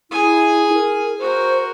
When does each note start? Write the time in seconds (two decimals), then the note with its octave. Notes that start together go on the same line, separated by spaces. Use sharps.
0.11 E4 G#4 G#5
0.74 A#4
1.20 F#4 A#4 C5